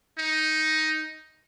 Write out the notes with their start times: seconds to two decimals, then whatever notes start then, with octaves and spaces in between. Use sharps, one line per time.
0.18 D#4